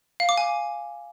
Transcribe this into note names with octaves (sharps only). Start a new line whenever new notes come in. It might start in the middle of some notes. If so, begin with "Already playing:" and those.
F5
D6
G#5